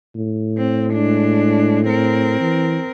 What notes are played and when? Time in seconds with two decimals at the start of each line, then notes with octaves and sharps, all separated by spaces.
0.15 A2
0.57 C4
0.93 G#3 D4
1.86 C4 A#4
2.41 E3